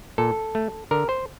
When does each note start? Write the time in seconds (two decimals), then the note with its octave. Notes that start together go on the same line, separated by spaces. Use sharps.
0.18 A#2 A4
0.55 A3
0.91 D3 A#4
1.09 C5